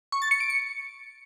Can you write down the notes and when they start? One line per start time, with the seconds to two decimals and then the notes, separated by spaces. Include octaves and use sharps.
0.12 C#6
0.22 A6
0.31 C#7
0.40 D7
0.50 C#7